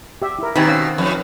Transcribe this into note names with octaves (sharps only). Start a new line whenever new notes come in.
G4 E5
E4 A#4
B2 D#3 C4 G4 G#5 B5
C#4 F5 E6
F2